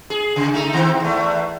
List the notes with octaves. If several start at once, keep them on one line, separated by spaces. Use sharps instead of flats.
G#4
C#3
A3 D#4
D#3 C4
E2 A3